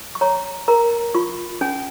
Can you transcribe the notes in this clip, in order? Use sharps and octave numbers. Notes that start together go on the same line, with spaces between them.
C#6
C#5 A#5
A#4 A#5
F4 C#6
C#4 G#5